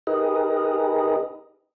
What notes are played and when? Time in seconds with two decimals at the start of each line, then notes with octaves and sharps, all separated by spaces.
0.07 D#4 G4 G#4 A#4 B4 D#5